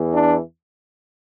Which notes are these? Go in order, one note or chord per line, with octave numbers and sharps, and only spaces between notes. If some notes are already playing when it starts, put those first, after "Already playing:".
Already playing: E2 E3
D4